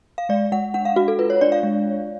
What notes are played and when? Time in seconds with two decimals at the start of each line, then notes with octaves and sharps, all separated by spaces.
0.18 F5
0.29 G#3 D5
0.52 G#3 F#5
0.74 D4 F#5
0.85 F5
0.96 G#3 F#4
1.08 A4
1.19 F4 B4
1.30 C#5
1.41 D4 D5
1.52 F5
1.63 G#3